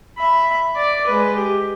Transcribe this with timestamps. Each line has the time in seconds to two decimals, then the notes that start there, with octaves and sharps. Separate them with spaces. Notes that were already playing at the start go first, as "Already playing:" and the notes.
0.18 E5 B5
0.76 D5
1.07 G#3 B4
1.36 G4